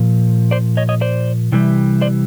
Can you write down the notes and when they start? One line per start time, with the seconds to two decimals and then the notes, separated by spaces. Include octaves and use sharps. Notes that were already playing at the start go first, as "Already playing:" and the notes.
Already playing: A#2 F3
0.51 C5 D5
0.77 C#5 D#5
0.89 C#5 D#5
1.01 C5 D5
1.52 C3 E3 G3
2.01 C5 D5